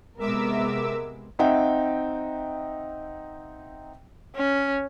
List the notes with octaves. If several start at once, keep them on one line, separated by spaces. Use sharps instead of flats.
C3 G#3 B3 A#4 E5 D6 E6
C4 D#4 E5 F#5 G5
C#4